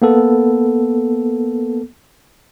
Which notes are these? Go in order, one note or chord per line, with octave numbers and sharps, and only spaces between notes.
A#3 B3 A4